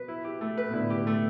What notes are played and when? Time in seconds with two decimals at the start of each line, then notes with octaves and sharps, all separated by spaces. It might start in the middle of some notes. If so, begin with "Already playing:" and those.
Already playing: B2 B4
0.08 E4
0.24 G4
0.41 A3
0.58 B4
0.69 B2
0.73 A2 D3 E4
0.90 G4
1.07 A3